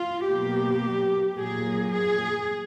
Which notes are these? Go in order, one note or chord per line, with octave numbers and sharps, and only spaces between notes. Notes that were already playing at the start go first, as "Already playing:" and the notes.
Already playing: F4
B2 F#3 A#3 G4
A#2 F#3 A#3 G#4
G#4